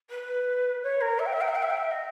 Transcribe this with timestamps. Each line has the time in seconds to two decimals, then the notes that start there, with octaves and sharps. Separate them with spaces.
0.10 B4
0.83 C#5
1.01 A#4
1.19 E5
1.26 G5
1.33 E5
1.41 G5
1.48 E5
1.55 G5
1.62 E5
1.70 G5
1.77 E5
1.91 D#5